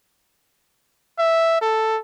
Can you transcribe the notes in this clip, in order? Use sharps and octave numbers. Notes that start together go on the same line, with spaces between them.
E5
A4